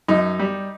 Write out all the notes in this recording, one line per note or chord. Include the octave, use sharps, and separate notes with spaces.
F#2 D#4
G3